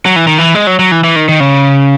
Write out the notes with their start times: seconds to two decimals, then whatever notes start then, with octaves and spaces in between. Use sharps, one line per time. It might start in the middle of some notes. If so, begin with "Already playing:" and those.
0.05 F#3
0.16 E3
0.27 D#3
0.38 E3
0.55 G#3
0.67 F#3
0.79 F#3
0.92 E3
1.04 E3
1.16 D#3
1.29 D#3
1.40 C#3